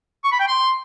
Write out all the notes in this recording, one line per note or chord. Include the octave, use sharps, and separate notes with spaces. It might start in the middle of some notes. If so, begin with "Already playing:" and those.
C#6
B5
G5
C6